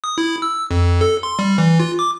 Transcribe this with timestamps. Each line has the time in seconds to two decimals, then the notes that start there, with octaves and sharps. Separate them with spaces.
0.04 D#6
0.18 E4
0.42 E6
0.71 F2
1.01 A4
1.23 C6
1.39 G3
1.58 E3
1.80 F4
1.99 D6